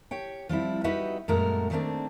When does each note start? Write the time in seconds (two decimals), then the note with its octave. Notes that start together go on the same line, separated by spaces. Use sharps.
0.11 G4 C#5 G5
0.49 F3 G3 C4 E4
0.84 D#4 F#4 G4 B4 D#5 E5
1.28 F#2 A#2 G#3 A3 F#4 A#4
1.70 D#3 G3 A3 A#3 C4 D4